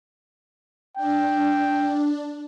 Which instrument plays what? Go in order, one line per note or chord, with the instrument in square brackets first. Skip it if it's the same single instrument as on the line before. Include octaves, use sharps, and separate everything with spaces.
[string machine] D4 [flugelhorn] G5